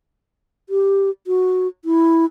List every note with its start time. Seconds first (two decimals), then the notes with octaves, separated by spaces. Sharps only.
0.69 G4
1.27 F#4
1.85 E4